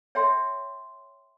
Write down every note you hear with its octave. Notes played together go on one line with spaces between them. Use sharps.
C#5 E5 G5 C6